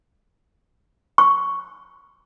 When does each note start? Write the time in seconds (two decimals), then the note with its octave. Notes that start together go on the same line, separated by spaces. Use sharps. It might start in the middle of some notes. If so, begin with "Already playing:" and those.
1.18 C#6